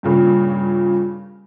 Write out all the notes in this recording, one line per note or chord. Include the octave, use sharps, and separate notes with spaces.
G2 A#2 C#3